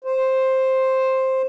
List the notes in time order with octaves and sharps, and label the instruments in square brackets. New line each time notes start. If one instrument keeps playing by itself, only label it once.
[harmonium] C5